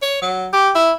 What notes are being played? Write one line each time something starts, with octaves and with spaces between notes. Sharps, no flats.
C#5
F#3
G4
E4